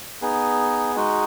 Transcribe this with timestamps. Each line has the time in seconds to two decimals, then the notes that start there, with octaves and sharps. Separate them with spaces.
0.22 B3 D#4 G#4
0.96 G#3 D#4 F#4